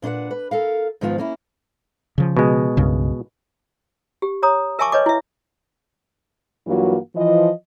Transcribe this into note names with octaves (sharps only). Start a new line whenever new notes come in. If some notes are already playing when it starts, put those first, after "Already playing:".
A#2 D4 E4 B4 F#5
B4
A4 A#4 F5
G#2 D#3 F3 B3 F4
A#3 C#4 E4
C#3 F3
B2 G#3
C2 G2 C#3
G4
C#5 A#5 D#6
A#4 E5 G#5 A5 C#6 D6
B4 C#5 D#5 D6
E4 E5
G2 E3 F#3 A#3 F4 F#4
E3 F3 D#5